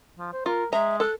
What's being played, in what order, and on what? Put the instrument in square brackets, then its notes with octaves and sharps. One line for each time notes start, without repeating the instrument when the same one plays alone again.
[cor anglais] F3
C5
[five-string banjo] F4 [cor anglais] A#4
[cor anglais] G#3 [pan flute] E5 [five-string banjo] A#5
[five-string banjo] A4 [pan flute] F#6